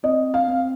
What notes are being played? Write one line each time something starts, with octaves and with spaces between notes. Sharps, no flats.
C4 D#5
F5
C4